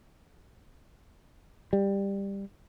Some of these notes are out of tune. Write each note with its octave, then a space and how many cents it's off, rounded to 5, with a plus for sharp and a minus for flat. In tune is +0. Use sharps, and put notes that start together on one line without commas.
G3 +15